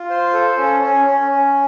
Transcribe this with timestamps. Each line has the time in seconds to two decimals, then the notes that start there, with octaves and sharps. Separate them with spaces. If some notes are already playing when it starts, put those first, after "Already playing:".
Already playing: F4
0.10 C5
0.33 A4
0.57 C#4
0.82 C#4
1.06 C#4
1.31 C#4